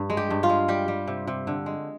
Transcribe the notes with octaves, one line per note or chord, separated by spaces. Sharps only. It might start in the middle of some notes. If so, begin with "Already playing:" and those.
Already playing: G2
G#3
G4
G2
F4
G#3
G3 G4
G3
C3
C3
D3
G#3